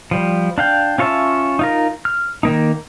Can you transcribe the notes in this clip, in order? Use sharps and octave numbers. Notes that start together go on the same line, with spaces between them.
F3 G3
D4 F5 G5
C#4 F4 C#5 E5 A5
D#4 F4 A#4
F6
D#3 A#3 D#4